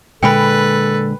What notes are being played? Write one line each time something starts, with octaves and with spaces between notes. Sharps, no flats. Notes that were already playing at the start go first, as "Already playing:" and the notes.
A#2 D3 G#3 A4 B4 G5 G#5 B5